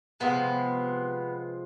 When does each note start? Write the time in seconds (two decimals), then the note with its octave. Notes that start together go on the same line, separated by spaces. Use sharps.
0.20 C3 F3 G#3 B3